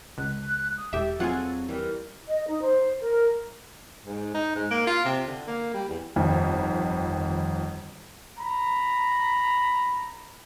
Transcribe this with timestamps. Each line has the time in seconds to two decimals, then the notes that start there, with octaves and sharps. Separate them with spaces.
0.18 C#2 F#6
0.77 D#6
0.93 E1 G4 A4 E5
1.20 F#3 C4 F4 G#4 F#5
1.69 E3 G3 A#4
2.28 D#5
2.47 D#4
2.64 C5
3.00 A#4
4.06 G#2
4.34 D#4
4.55 G#2
4.71 A#3
4.87 F4
5.05 C3
5.27 D3
5.47 A#3
5.74 G3
5.88 E2
6.16 G1 F2 D#3
8.39 A#5 B5